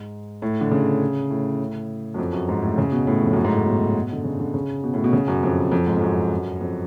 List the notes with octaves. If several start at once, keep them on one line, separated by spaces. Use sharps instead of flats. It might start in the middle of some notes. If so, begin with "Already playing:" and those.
Already playing: G#2
A2
D3
C#3
A2
F#2
F2
F#2
G#2
A2
C#3
B2
A2
F2
F#2
G#2
A2
B2
D3
C#3
D3
C#3
B2
A2
B2
C#3
F#2
F2
F2
G#2
F2
F#2
F2